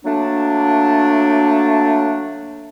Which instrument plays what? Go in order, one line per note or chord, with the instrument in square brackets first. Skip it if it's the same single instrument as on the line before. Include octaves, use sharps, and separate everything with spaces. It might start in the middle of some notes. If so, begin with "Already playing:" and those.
[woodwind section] F#3 A3 A#3 D4